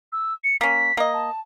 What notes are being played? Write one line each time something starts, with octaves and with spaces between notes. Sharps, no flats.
E6
C#7
A#3 C#4 B6
A#3 D#5
A5